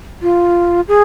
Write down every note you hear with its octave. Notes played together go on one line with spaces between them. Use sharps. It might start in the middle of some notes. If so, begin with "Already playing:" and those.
F4
G#4